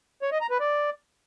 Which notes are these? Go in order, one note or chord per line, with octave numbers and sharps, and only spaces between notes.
C#5
D#5
A#5
B4
D5